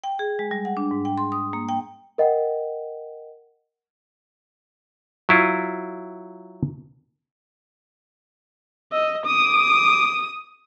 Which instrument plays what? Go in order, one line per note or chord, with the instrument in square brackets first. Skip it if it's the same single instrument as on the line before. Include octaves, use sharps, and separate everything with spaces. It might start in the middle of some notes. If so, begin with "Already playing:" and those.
[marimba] G5
G#4
G#3
G3
F#5
D4
G#2
G5
C6
D#6
A#3
G5
[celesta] A#4 D#5 F#5 G5
[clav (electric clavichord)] F#3 E4 F4
[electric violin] D#5 [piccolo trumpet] E6
[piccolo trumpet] D6 [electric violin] D#6